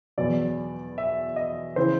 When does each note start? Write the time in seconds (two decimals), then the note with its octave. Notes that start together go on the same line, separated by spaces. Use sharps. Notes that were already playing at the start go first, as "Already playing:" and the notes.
0.18 E2 B2 F#3 D5
0.98 E5
1.36 D#5
1.76 C#3 E3 C5